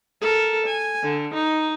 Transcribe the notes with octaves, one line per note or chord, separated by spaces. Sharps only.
A4 A#4
G#5
D3
D#4